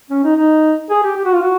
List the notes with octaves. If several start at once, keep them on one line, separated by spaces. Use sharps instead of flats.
C#4
D#4
D#4
G#4
G4
G4
F#4
F4
F#4